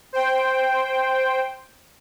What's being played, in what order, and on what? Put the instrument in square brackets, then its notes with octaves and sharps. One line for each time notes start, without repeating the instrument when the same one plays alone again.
[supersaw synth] C5 G5